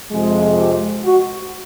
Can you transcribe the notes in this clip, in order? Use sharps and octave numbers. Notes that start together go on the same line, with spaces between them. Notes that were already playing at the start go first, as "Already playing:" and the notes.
F2 C3 F3 G#3
G4
F#4